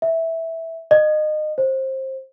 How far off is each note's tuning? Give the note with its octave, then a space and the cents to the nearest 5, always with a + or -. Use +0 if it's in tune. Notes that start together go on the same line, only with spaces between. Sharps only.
E5 -10
D#5 -25
C5 +20